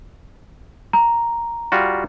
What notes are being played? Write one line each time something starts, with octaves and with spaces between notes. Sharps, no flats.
A#5
G3 F4 F#4